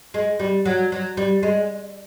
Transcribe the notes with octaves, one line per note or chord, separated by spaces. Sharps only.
G#3
G3
F#3
F#3
G3
G#3